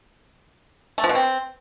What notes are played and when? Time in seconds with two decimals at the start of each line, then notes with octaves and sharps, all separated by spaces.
0.98 A3
1.04 F3
1.09 B2
1.15 C4